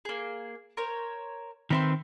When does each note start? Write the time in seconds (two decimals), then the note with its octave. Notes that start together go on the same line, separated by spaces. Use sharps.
0.05 A#3 G#4
0.77 A#4 C5 C#5
1.70 D#3 C4 B4 E5 C6